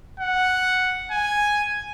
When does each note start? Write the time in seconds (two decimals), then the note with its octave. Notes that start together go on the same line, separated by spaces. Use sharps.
0.20 F#5
1.11 G#5